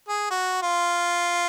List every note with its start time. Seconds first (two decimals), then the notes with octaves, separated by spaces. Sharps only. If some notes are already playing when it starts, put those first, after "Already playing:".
0.09 G#4
0.31 F#4
0.62 F4